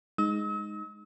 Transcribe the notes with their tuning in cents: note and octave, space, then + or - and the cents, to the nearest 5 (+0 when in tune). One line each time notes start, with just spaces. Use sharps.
G#3 +0 D#4 +0 E6 -45